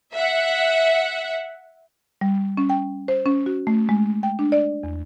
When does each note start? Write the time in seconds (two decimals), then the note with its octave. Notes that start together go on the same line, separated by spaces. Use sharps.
0.15 E5 F#5
2.21 G3
2.57 C#4
2.70 G5
3.08 C5
3.26 C#4
3.46 F#4
3.67 A3
3.89 G#3
4.23 G5
4.39 D4
4.52 D5
4.83 E2